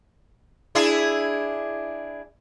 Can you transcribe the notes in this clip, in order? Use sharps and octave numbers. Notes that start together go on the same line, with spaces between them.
D4 E4 G#4